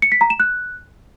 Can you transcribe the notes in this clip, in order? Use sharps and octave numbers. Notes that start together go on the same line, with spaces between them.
C#7
B6
A#5
E7
F#6